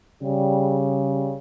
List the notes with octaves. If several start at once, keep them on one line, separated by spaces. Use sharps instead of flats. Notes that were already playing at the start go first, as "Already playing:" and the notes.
C#3 G3